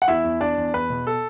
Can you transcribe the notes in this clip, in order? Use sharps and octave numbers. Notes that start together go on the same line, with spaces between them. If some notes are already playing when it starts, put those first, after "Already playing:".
F#5
E2 E4 E5
E2
E2 D4 D5
E2
E2 B4
B2
A4